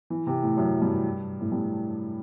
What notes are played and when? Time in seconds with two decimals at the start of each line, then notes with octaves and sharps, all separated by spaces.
0.10 E3
0.27 C3
0.43 A2
0.57 F#2
0.82 G2
1.41 A2
1.52 G2